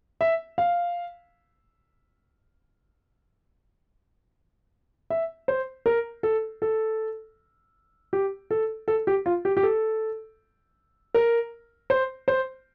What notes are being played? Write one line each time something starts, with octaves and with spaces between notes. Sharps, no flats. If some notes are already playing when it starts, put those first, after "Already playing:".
E5
F5
E5
C5
A#4
A4
A4
G4
A4
A4
G4
F4
G4
G4
A4
A#4
C5
C5